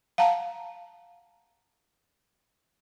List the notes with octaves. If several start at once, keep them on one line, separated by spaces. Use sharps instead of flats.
F5 F#5 A5 A#5